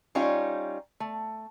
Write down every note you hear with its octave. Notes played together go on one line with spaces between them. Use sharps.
G3 C#4 D#4 F4 C#5 G5
A3